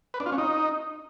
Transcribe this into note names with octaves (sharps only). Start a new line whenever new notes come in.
B4
D4
F4
C#4
D#4